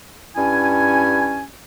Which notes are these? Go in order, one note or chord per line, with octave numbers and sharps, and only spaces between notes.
G2 C#4 E4 G#5